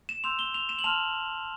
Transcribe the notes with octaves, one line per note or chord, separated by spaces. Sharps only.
E7
C6 E6 G6 F7
G7
F7
E7
F#7
A5 C6 F6 F7